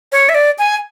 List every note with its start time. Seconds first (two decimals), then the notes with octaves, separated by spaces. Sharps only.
0.12 C#5
0.29 E5
0.35 D5
0.59 G#5